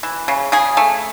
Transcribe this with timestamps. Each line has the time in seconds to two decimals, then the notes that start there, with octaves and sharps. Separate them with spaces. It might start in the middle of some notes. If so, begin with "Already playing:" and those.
0.03 E3
0.28 C#3
0.52 C#3 G#4
0.77 A3